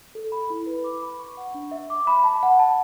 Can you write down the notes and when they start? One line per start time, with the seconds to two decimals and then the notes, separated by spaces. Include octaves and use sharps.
0.15 A4
0.32 B5
0.50 E4
0.66 B4
0.84 D6
1.02 B5
1.19 C#6
1.37 F#5
1.54 D4
1.71 E5
1.90 D6
2.07 B5
2.24 A5
2.43 F#5
2.59 A5